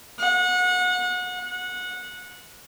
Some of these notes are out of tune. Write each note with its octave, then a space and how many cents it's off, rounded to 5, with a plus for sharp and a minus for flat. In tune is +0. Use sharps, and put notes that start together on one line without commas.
F#5 -30
F#5 -20